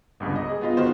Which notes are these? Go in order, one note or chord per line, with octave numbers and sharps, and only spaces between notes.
G1 C#2 G2
D#5
G#4
B3 F4 D#5
D#3 F4 F#4 C5